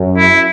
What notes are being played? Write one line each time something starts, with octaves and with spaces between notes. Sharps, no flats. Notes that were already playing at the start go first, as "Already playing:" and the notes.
Already playing: F#2
E4